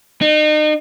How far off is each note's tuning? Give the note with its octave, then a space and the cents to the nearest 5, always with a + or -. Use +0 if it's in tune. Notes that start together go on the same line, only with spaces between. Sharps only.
D#4 -35